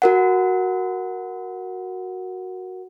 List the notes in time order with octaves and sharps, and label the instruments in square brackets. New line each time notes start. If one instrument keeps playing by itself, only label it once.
[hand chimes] F#4 A#4 F#5